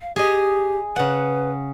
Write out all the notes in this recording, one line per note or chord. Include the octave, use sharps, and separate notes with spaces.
F5
G4 G#4 D#5
C#3 B4 F#5